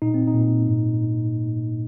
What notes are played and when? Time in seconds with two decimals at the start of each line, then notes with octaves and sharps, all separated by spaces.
0.02 A#2 D#4
0.14 C4
0.27 D#4
0.35 A#2
0.67 G#2